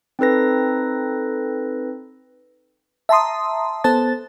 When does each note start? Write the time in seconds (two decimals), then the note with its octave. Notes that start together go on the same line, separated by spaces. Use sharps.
0.19 C4 D#4 A4 B4 A#6
3.09 E5 A5 A#5 C6 D#6
3.84 B3 A4 C5 A5 A6